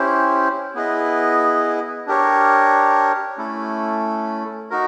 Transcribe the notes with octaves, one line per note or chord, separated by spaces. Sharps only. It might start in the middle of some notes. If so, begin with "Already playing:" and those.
Already playing: C#4 E4 G4 C5
B3 E4 G#4 B4 D#5
D4 G4 A#4 C#5
A3 C#4 E4 A4
D#4 F#4 A#4